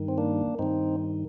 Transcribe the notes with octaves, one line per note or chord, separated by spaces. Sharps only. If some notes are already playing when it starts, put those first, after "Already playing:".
Already playing: G2 D#3
C4
A#3 D4
G2 D#3 C4 D#4